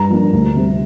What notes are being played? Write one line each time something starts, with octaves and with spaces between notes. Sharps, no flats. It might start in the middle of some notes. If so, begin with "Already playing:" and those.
Already playing: G2 A#5
F3 A#3 D4
D2
C3 G3 C4